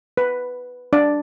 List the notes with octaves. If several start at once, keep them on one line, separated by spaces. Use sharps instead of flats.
B4
D4 D5